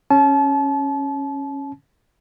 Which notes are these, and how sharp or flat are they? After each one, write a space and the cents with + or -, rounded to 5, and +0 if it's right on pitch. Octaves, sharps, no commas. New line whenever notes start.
C#4 -10 A5 -35